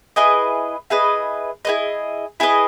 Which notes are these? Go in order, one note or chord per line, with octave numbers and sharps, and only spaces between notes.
E4 G#4 B4 D#5
E4 G#4 B4 D#5
E4 G#4 B4 D#5
E4 G#4 B4 D#5